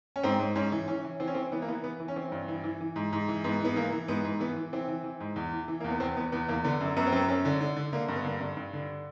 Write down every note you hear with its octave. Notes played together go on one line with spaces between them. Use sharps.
C#4
G#2 C4
G#2
G#2 C#4
E3
E3 C#4
E3
E3 C4
C#4
E3 C4
E3 B3
A#3
E3 B3
E3 B3
E3
C#4
E3 C4
G2
E3
E3
E3
G#2
G#2
E3
G#2 B3
E3 B3
E3 A#3
E3
G#2 B3
G#2
E3 B3
E3
E3 C4
E3
E3
G#2
E2
E3
E3
E2 A#3
B3
E2 C4
E2 B3
E2 B3
E2 A#3
D3 B3
F#2
F#2 B3
C4
F#2 B3
F#2 C#4
D3
D3
D3
D3 A#3
G2
B3
D3 A#3
G2
G2
D3